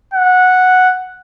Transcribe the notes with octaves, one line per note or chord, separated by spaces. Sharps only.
F#5